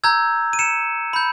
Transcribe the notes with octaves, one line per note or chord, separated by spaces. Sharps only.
A#5 E6 G6 G#6
D#7
C#7 E7
B5 G6